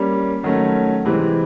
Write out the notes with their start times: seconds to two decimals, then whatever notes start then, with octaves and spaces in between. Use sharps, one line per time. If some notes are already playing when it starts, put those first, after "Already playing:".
Already playing: G3 A#3 C#4
0.43 D#3 F#3 A3 C#4
1.05 C3 E3 G#3 C4